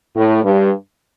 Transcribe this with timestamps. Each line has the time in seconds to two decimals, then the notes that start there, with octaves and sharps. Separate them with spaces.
0.15 A2
0.44 G2